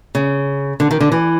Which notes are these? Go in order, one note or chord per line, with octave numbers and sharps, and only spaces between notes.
C#3
D3
D#3
D3
E3